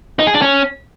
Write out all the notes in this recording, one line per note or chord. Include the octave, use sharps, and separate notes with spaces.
D#4
G#4
D4
C#4